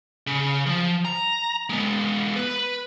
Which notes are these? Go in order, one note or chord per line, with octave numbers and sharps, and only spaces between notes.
C#3
F3
A#5
G#3 B3
B4